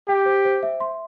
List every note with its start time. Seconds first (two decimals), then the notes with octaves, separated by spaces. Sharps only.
0.08 G4 G5
0.26 C5
0.45 C5
0.63 E5
0.80 C6